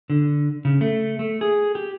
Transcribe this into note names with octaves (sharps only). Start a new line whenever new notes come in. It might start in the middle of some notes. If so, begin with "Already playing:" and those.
D3
C#3
A3
A3
G#4
G4